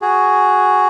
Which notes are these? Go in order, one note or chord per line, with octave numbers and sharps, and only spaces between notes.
F#4 G#4